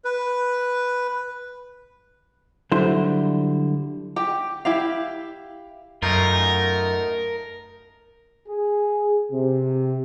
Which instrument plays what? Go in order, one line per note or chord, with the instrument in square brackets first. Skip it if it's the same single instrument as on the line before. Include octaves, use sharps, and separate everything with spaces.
[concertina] B4
[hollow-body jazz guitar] D3 F#3 G3 E4 C5 C6
[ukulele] G4 G5
E4 G4 F5
[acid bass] F#2 [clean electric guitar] A3 D#4 F4 [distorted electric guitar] A#4
[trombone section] G#4
C3